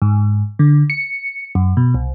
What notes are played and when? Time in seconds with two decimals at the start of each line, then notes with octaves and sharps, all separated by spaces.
0.02 G#2
0.59 D3
0.90 C#7
1.55 F#2
1.77 B2
1.95 C2